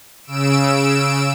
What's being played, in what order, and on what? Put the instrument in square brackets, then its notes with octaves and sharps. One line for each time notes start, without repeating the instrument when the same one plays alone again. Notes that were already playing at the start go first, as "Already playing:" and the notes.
[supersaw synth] C#3 E6 D7 E7